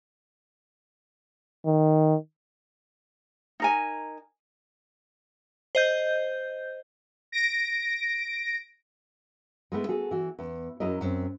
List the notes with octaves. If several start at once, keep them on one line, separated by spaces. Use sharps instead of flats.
D#3
D#4 A#4 G#5
C5 D#5 G6
A#6 D7
G#3 A3 B3 E4
F#4 G#4 A4
E3 F#4
E2
F#2 F#3 E4 A#4 D#5
F#2 C4